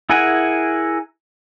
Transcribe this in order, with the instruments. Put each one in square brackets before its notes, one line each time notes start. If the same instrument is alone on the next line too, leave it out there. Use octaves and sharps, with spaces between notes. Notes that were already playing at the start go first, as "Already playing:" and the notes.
[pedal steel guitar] E4 G#4 A#4 F#5 G#5